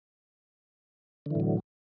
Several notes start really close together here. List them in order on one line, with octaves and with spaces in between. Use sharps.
D3 E3 A2 F#3